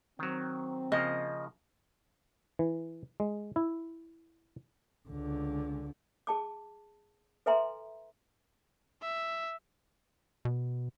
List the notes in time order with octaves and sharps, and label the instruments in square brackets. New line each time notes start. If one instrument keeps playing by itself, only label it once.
[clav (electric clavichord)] D#3 F#3 [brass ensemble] C4
[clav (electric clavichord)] C#3 F3 A#3 [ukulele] D#5
[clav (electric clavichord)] E3
G#3
E4
[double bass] C#2 D3
[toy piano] G#4 A5 D6
A4 B4 E5 G#5 A#5 C6
[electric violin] E5
[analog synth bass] B2